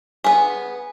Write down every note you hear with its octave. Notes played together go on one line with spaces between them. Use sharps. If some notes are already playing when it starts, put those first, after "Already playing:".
B3 G#4